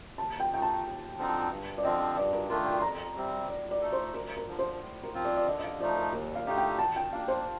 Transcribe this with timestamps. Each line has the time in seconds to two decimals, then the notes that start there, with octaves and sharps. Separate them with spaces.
0.18 D#2 A5
0.40 G5
0.51 D#3 A3 D#4 G5
0.62 A5
0.84 D#2
1.18 D3 F3 C4 D#4
1.50 G2
1.78 D5
1.83 D3 F3 C4 D#5
2.16 G2 D5
2.33 A#4
2.49 D#3 A3 D4 F4 A#4
2.66 G5
2.78 C6
2.82 F2 A#5
3.16 C3 G3 C4
3.48 A2 D5
3.71 D5
3.81 A3 D#4 A4
3.93 C5
4.14 D2 A#4
4.37 A#4
4.48 D3 F3
4.59 C5
4.81 A2
5.03 A#4
5.14 F3 C4 F4
5.25 D5
5.37 D5
5.47 D3 D#5
5.58 D#5
5.64 F5
5.80 F3 A3 D#4 D5
5.96 A#4
6.13 D#2 A#4
6.35 F5
6.47 D3 A3 D#4 G4 F5
6.58 G5
6.79 D#3 A5
6.96 G5
7.13 A#3 D4 F5
7.28 C5